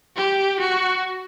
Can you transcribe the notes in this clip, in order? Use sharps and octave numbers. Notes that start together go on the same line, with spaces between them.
G4
F#4